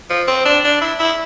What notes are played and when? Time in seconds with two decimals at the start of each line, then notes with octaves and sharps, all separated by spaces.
0.10 F3
0.28 C4
0.45 D4
0.64 D4
0.81 E4
1.00 E4